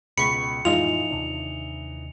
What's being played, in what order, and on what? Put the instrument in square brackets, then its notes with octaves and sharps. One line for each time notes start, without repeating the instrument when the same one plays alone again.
[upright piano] C#2 [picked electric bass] B2 [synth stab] B5 C#6 [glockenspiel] C#7
[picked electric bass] F2 A2 [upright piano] E3 D#4 [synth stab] G#3 F4 [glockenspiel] F7
[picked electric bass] D#2 C3 D4